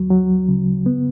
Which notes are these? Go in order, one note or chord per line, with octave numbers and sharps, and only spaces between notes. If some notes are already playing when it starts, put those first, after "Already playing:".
Already playing: D2 F#3
F#3
C#3
B3